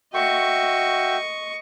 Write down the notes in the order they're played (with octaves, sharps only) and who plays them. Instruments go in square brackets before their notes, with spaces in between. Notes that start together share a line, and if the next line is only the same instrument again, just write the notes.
[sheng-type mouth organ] F#4 E5 G5 [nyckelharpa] D#5 C#6